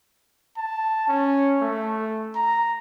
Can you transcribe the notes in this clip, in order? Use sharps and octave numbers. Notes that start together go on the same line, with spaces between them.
A5
C#4
A3
A#5